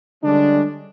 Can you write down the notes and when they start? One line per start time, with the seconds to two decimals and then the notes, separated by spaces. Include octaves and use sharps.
0.23 D3 G3 G#3 C#4 D4